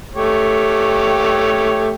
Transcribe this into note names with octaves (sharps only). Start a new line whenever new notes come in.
A3 G4 C#5